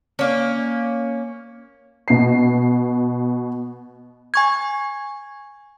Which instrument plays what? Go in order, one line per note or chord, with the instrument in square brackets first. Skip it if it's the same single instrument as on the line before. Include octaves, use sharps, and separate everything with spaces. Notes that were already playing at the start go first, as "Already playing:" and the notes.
[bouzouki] A#3 C#4
[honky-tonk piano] B2 C7
[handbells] G#5 C#6 G#6